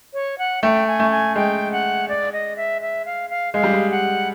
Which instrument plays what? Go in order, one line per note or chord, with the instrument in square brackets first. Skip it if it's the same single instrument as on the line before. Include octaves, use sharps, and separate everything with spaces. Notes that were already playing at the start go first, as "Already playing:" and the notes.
[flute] C#5
F#5
[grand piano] A3 [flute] G5
[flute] G#5
[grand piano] A3
[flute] G#5
[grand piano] G#3 [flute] G5
[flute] F#5
D5
D#5
E5
E5
F5
F5
[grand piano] G#3 [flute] F5
[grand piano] G3
G#3
[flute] F#5